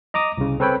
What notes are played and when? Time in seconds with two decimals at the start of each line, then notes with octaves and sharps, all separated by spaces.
0.14 D#5 A#5 D6 D#6
0.38 C2 C#3
0.60 C4 A4 B4 C#5 G5 B5